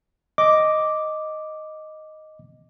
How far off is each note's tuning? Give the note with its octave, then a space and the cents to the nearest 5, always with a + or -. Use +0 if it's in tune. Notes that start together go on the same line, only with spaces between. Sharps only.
D#5 +0 D6 +0